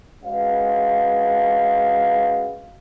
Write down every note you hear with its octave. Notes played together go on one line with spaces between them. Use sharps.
G#3 C#4 F#4 B4 F5